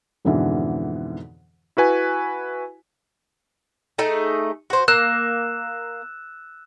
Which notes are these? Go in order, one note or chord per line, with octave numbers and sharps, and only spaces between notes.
F2 G#2 B2 D3 E3
E4 F#4 B4 G#5
A3 D#4 G#4
F#4 C5
A#3 E6 F#6 E7